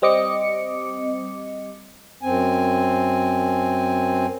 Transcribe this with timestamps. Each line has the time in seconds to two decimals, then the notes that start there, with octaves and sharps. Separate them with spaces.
0.02 G3 C4 D#5 D6 C#7
2.23 F#2 C4 G#5